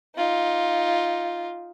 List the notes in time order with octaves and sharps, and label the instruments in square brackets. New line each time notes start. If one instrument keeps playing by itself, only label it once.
[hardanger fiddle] D#4 F4